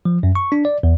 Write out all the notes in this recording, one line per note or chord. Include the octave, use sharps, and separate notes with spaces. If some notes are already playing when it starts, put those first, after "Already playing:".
F3
F#2
C#6
D4
D5
E2